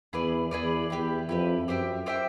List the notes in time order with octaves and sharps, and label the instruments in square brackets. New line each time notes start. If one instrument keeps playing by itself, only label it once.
[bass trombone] E2 [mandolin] E4 G#4 B4 D5
[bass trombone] E2 [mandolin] E4 G#4 B4 D5
[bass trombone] E2 [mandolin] E4 G4 B4
[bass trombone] F2 [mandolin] E4 G4 B4
[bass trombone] F#2 [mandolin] G4 C5 E5 G5
[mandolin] G4 C5 E5 G5